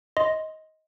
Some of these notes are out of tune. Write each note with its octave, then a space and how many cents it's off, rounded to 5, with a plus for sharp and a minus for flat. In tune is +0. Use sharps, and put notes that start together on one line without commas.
D#5 +15 C6 +0